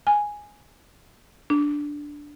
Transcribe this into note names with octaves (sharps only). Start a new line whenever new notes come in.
G#5
D4